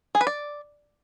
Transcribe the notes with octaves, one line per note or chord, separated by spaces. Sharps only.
G#4
B4
D5